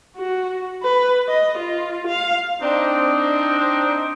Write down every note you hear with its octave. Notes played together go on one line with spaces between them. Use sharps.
F#4
B4
D#5
F4
F5
C4 D4 D#4